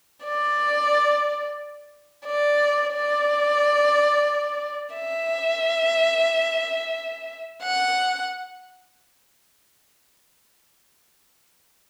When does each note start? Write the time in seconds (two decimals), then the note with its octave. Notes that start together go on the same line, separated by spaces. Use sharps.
0.25 D5
2.26 D5
2.93 D5
4.95 E5
7.63 F#5